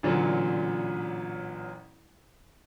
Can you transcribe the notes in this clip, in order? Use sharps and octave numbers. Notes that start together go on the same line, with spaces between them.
A1 A#2 D3 F#3